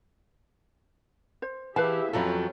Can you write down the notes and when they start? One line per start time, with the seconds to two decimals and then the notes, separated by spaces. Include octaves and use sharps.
1.42 C5
1.76 E3 G4 G#4 B4 E5 F5 A5
2.13 F2 F3 F#3 C#4 A4 A#5 B5